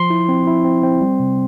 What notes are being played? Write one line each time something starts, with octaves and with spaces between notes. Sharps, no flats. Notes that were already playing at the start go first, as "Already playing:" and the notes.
Already playing: F3 C6
E4
C4
E4
C4
C4
G3
C3